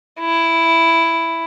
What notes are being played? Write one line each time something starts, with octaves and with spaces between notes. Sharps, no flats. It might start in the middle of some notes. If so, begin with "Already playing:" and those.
E4